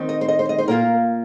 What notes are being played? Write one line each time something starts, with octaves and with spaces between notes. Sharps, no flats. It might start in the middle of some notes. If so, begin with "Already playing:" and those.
Already playing: D#3 C4 D#4
D#5
C5
D#5
C5
D#5
C5
A#2 A#3 F4 A#4